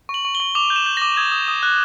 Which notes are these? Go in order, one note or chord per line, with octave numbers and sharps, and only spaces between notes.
C#6
F#7
C#6
G7
C#6
D6 F7
G6
E7
G6
A#6
D6
D#6 G#6
D#6
D#6
F#6